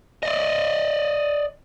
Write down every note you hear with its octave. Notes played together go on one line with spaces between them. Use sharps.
D5 D#5